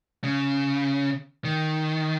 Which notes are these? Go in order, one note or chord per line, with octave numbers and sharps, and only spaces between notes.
C#3
D#3